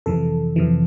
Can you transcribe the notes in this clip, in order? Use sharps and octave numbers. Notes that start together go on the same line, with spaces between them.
F2 C3 E3 A4
F2 C3 E3